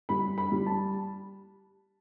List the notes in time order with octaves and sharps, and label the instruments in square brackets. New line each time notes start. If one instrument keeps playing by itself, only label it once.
[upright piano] G3 B5
B5
G3
A5